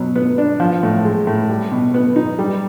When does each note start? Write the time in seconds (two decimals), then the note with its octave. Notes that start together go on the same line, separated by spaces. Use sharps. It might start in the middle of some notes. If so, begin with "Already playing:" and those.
Already playing: B2 F#3
0.16 B3
0.38 D4
0.60 F3
0.83 A2
1.05 G#3
1.27 A2
1.50 G3
1.72 B2
1.94 B3
2.16 D#4
2.39 G3